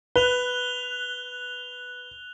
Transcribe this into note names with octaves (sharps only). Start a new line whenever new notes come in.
B4 F#6 F7 G7